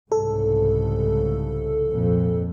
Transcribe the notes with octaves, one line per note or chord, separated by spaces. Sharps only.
C2 G#2 C#3 A4
F2 A#2